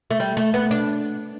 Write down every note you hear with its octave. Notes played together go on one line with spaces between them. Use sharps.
A3
G3
A3
B3
D4